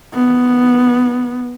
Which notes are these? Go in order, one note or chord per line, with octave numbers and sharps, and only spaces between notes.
B3